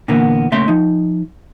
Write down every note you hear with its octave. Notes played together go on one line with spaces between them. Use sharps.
A#2 D3 E3 A#3 B3
A#2 C#3 A3 E5 C6
F3 D#4